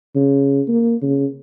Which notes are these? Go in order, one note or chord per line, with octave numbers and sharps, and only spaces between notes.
C#3
A#3
C#3